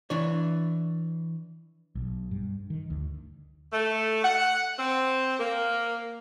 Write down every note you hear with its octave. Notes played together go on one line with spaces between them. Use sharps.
E3 D4 C#5
B1
G2
D#3
D2
A3
F#5
C4
A#3